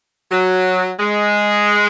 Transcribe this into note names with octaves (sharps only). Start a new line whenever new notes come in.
F#3
G#3